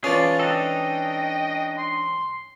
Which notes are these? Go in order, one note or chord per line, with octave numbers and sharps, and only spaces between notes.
E3 G#3 C#4 F4 G#4 D5 A5
D4 D#4 A4 D#5 G5
C6